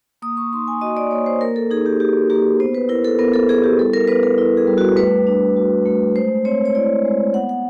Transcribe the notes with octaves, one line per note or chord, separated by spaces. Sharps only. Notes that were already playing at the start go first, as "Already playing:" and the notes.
A#3 D#6
C#6
D#4 C6
G#5
F#4 D#5
D5
A#3 C#5
C5
A#3 A#4
A4
D#4 G#4
G4
F#4 G4
A#3 G4
B3 C5
B4
E4 A#4
A4
B3 A#4
A4
E4 G#4
G4
G3 A4
A#4
B3 B4
A#4
E4
G#4
G3
F#4
A3 B4
D4
F#4
A3
G#3 C5
C4 C#5
C#5
E4 D5
G#3
B3 F#5
F#5